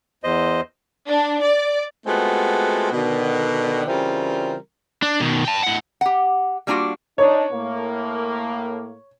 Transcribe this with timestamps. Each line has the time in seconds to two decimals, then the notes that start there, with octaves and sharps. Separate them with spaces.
0.24 E2 C5 D#5
1.08 D4
1.41 D5
2.06 G#3 A3 B3 C4 F4 F#4
2.92 B2 D3 D#3
3.87 C#3 E3 G3 C4 F4 A#4
5.02 D4
5.20 B2 D#3
5.45 G5 A5
5.63 A2 F#5
6.01 G4 F#5
6.67 G3 A#3 D4 F4 F#4
7.18 D4 D#4 C#5
7.51 A2 A#3